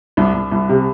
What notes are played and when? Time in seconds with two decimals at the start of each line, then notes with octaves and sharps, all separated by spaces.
0.17 C2 D4
0.34 C2
0.52 C2
0.69 C3